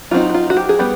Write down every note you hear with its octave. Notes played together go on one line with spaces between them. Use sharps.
F#3 A3 C4 D#4 F4
F#4
F4
F#4
G4
G#4
G3 B3 G4